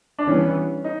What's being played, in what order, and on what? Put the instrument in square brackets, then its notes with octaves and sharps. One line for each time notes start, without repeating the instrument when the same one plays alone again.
[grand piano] D4
[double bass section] E3 G3 B3 [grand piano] C#4
[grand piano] D#4